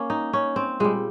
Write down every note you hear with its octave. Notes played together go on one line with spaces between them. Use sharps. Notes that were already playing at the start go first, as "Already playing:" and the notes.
Already playing: A#3 C#4
D#4
C#4
C4
A#2 G3 G#3